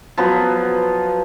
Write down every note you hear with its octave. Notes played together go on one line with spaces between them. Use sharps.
F3 F#3 B3